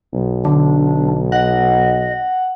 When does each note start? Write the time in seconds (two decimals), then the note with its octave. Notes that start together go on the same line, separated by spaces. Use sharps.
0.13 B1
0.45 D3 D4
1.32 D#5 F#5